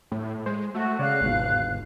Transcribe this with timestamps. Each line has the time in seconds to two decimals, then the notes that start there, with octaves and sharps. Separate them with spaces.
0.12 A2
0.46 G#3 C5
0.74 A3 F#4
0.99 C#3 C#5 D5 F5 F#6
1.21 G1 D#2 G#2 B2